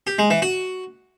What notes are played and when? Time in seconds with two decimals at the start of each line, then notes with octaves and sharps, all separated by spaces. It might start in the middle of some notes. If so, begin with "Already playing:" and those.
0.07 G4
0.19 G#3
0.30 E3
0.42 F#4